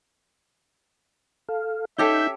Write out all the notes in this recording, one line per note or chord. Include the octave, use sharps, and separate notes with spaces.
A4 F5
C#4 D#4 G4 A4 E5 G6